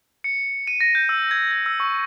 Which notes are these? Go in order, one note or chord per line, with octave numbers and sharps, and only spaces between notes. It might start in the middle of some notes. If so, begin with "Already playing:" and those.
C#7
D#7
A#6
G6
E6
G#6
G#6
E6
C#6